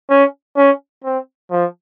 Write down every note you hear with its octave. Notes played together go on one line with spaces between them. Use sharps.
C#4
C#4
C4
F3